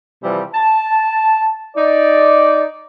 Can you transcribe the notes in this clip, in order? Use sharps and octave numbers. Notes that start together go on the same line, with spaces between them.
C3 E3 F3 G3
A5
D#4 D5